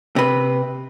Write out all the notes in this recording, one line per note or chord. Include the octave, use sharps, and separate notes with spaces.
C3 B4